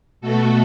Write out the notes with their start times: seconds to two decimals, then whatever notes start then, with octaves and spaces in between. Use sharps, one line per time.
0.21 B2 A3 F#4 A4